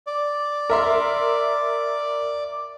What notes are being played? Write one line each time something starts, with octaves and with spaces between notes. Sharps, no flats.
D5
A#4 E5 C6